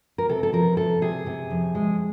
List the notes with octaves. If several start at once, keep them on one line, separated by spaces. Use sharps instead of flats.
A#4
C3 A4
A4
F3 A#4
C3 A4
C3 G#4
C3
F2
G#3